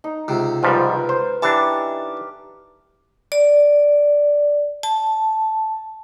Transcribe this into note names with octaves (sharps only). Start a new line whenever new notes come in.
D#4
C#2 C3
G#2 F3 G3 A#4 B4
C5
E3 D4 G4 C#5 A5
D5
A5